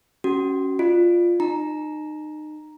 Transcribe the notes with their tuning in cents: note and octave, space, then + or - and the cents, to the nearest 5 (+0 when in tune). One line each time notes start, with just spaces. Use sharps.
C#4 +0 F#4 +25
F4 +0 D5 +35
D#4 -30 A#5 +5